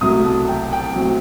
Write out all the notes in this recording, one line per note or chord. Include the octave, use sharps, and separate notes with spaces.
C2 B2 F#3 A3 D#6
A5
G5
G5
B2 F#3 A3 C4